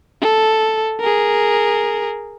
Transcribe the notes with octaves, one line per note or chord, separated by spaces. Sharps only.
A4
G#4 A#4